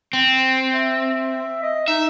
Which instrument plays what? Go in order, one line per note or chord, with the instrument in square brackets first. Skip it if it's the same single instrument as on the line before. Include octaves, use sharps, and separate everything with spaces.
[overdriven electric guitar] C4
[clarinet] E5
D#5
[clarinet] D#4 [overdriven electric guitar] E5